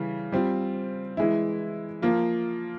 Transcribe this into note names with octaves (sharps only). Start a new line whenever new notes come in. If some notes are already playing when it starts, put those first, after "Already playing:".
Already playing: C#3 E3 G3
G3 C4 F4
E3 G#3 E4
F3 A#3 F4